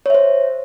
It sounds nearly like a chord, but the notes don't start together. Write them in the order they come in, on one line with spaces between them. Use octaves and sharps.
C#5 E5 C5